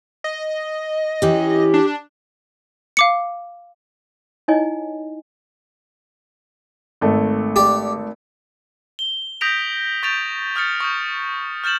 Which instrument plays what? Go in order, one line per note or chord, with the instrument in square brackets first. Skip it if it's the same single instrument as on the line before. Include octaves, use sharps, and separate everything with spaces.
[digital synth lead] D#5
[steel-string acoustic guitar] E3 C#4 [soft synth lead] G4
[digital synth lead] D4
[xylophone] F5 D6 C#7
[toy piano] D#4 E4 C#5 D#5 G#5
[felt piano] G#1 A3 A4
[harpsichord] G4 D5
[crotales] G7
D#6 G6 A#6 B6 D7 F7
C#6 G6 A6 D7 F7
D#6 F6 G6 A6 C#7
C#6 D#6 G6
F6 G6 A6 E7 F#7